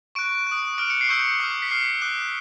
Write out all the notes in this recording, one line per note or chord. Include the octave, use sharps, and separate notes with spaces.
C#6 F#6 D7
D#6 F#6
D6 F6 D7
C#7
C7
C#6 E6 G6 C#7
D6 F6
B6
D6 F6 C7
D6 F#6